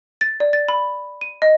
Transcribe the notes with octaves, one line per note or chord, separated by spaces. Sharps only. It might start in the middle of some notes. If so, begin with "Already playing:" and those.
A6
D5
A6
B5
D#7
D#5